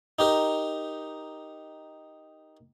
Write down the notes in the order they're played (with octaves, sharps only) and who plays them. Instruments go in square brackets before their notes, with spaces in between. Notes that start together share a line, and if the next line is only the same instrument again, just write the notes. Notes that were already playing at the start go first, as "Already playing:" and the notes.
[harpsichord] D#4 G4 A#4